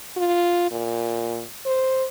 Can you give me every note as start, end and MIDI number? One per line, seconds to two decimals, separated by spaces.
0.17 0.70 65
0.71 1.44 46
1.66 2.06 72